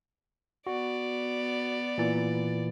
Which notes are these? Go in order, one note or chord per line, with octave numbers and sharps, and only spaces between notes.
B3 F#4 D5
A#2 E3 A6